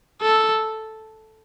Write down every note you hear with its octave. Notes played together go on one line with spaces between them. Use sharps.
A4